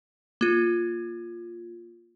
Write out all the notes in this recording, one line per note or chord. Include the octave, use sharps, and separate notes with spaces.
A#3 F4